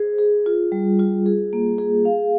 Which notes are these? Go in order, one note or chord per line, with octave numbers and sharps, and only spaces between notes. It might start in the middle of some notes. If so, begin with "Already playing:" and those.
Already playing: G#4 C5
G#4
F4
G3
F4
G#4
A#3
G#4
F5